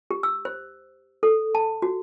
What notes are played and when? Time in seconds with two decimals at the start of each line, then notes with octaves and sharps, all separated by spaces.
0.11 G4
0.23 E6
0.45 C5
1.23 A4
1.55 A5
1.82 F#4